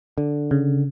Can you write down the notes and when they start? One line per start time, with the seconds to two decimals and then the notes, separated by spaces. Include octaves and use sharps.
0.18 D3
0.51 C#3